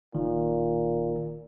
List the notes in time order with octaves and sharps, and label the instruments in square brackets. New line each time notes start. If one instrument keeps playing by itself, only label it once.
[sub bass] D1 [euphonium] A#2 [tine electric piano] D#3